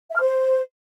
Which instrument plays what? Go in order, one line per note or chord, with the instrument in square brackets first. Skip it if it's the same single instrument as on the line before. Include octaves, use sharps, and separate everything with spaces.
[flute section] E5
F6
C5